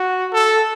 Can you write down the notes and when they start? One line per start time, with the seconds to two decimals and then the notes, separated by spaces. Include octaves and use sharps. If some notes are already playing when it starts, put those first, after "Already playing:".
Already playing: F#4
0.33 A4